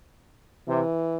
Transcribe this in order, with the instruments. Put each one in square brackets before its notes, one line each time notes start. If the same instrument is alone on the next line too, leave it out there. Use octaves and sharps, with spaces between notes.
[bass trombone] C3 [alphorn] E3